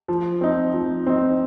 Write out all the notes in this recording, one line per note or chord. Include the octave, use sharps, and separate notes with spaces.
F3
C4 D#4
F3
C4 D#4